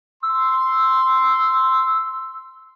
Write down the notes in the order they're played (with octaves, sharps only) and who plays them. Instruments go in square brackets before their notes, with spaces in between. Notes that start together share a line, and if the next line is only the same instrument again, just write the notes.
[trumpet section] C6 [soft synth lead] E6